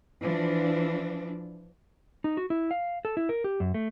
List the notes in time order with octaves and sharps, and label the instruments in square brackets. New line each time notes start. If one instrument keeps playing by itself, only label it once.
[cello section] E3 F3 D4
[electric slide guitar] D#4
F#4
E4
F5
A4
E4
A#4
G4
F#2
A3